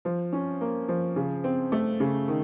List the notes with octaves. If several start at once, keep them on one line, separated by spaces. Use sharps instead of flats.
F3
C#4
A#3
F3
C#3
C4
A3
C#3
D#3